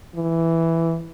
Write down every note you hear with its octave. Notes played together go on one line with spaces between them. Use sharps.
E3